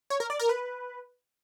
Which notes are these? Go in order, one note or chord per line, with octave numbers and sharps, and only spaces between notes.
C#5
A#4
D5
A#4
B4